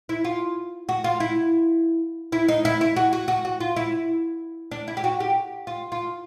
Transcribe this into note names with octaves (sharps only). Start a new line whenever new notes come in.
E4
F4
F#4
F4
E4
E4
D#4
E4
E4
F#4
F#4
F#4
F#4
F4
E4
D4
E4
G4
F#4
G4
F4
F4